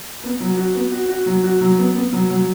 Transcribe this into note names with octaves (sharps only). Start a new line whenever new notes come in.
B3
F#3
F#4
B3
F#4
F#4
F#3
F#4
F#3
B3
B3
F#3
F#3